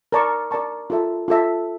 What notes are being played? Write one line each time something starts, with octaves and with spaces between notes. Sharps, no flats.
A#4 D5 A5 C#6
A#4 D5 A5 C#6
F4 A4 E5
F4 A4 E5